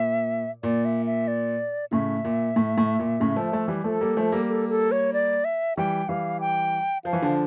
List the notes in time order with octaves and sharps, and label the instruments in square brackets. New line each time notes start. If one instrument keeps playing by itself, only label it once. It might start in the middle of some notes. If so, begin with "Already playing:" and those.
Already playing: [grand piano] A#2 [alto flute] E5
[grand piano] A#2 [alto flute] D5
[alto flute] E5
E5
D5
[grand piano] A2 C#3 [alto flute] E5
[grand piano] A#2
A2
A2
A#2
A2 C#3
F3 A3
F3 A3
E3 G3
[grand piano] F3 A3 [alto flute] A4
[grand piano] G3 A#3
F3 A3
G3 A#3
[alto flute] A4
A4
C#5
D5
E5
[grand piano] E3 G3 [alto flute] G5
[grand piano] E3 G3 [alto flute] F5
[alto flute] G5
[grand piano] F3 [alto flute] F5
[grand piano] E3
D3 F3